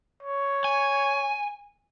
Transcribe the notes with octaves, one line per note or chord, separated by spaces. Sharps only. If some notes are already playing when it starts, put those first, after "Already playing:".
C#5
G#5